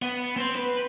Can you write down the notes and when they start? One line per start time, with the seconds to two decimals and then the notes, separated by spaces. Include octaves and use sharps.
0.02 B3
0.37 C4 C5
0.56 B4